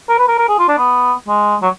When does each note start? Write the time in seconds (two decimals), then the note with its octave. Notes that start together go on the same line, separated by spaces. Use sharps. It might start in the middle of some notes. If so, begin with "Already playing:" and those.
0.09 A#4
0.19 B4
0.28 A#4
0.38 A#4
0.48 G#4
0.59 F4
0.68 D4
0.78 B3
1.28 G#3
1.62 F#3